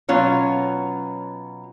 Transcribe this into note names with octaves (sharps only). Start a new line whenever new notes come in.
B2 F#3 C#4 F4